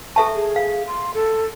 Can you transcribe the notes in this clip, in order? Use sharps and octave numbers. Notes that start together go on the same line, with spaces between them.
A4 E5 A5 C#6
G#4
F5
C6
A4